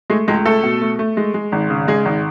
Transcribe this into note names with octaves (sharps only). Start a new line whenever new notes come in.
G#3 A3 G#4
C#2 G#3 G#4
A3 A4
B2
A3
A3
G#3
G#3
G#1
C#3
G#3 G#4
G#1